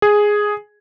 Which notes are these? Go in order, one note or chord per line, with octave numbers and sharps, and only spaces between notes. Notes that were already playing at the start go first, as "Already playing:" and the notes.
G#4